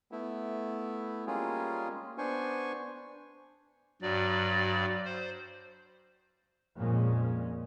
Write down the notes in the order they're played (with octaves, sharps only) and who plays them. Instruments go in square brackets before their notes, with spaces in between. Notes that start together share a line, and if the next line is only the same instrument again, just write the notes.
[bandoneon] A3 B3 E4
G3 G#3 A#3 C#4 F4 G#4
B3 D4 C5 G#5 C#6
[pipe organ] G2 D5 [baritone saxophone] F#3
[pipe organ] C5
[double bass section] F2 A#2 G#3 C#4